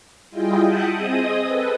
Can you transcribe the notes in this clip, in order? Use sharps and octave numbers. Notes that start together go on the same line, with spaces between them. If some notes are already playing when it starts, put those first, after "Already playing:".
G3 E4 F4 G#4 D#5 G5
E5 F#5 G5 A5 D#6 F#6
C4 G#4 D#5 D#6
A4 B4